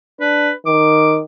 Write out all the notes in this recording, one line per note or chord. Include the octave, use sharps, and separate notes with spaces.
D4 B4
D#3 D6